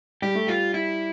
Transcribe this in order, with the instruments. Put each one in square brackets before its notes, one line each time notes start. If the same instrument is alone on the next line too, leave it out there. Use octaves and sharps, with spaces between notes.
[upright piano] G3 [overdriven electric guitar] G4
[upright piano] A3
[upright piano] G3 [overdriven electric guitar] F4
[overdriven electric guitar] E4